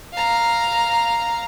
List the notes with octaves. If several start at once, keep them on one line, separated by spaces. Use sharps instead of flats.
F5 A#5